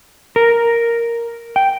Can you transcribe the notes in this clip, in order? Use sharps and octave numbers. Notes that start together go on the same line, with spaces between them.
A#4
G5